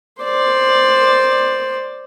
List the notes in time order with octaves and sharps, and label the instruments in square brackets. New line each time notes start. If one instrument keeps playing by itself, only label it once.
[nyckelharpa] C5 D5